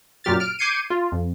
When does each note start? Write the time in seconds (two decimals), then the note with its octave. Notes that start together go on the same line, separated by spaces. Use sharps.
0.24 F#2 A#2 F#3 G4 F6 A6
0.40 F6 D7
0.59 D6 G6 G#6 C7 C#7 D#7
0.90 F4
1.12 F2